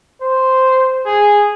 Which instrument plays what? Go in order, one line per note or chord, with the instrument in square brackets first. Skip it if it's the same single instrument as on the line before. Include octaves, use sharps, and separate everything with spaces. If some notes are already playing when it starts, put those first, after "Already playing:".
[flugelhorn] C5
G#4